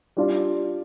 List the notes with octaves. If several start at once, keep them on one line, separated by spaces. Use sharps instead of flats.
G3 D4 F4